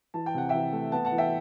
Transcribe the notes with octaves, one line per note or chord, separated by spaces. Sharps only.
E3 A5
G5
C3 F#5
E3 E5 G5
A3
B3 F#5 A5
F#5 A5
E3
E5 G5